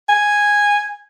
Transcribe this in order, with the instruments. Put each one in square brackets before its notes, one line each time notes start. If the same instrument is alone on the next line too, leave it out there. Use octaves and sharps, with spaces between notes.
[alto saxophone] G#5